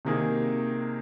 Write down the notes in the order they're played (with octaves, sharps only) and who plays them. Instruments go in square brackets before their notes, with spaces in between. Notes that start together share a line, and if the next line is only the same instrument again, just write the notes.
[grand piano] C3 D#3 A#3 G#4